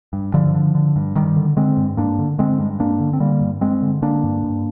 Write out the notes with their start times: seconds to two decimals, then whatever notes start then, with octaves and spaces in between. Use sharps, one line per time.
0.13 G2
0.33 G2 D3 F3
0.55 D3
0.75 D3
0.96 G2
1.16 G2 D#3 G3
1.36 D3
1.57 D3 G#3 C4
1.77 G2
1.97 G2 A#3 D4
2.19 D3
2.38 D3 G#3 C4
2.60 G2
2.80 G2 A#3 D4
3.00 D3
3.13 C4
3.20 D3 G3 A#3
3.41 G2
3.61 G2 G#3 C4
3.82 D3
4.02 D3 A#3 D4
4.24 G2
4.44 G2